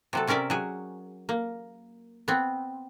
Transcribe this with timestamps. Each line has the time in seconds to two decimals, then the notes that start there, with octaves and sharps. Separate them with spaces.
0.13 C3 F#3 A4
0.27 C3 C#4 A#4 D5 E5
0.50 F#3 G#4
1.29 A#3
2.28 B3 C4